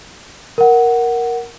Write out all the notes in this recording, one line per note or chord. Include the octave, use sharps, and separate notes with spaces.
A#4 F#5